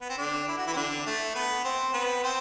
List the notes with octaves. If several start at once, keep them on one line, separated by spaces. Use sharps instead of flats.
B3
C4
D3 D4
E4
F#4
E3 E4
C4
D3 D4
A3 A4
B3 B4
C4 C5
B3 B4
C4 C5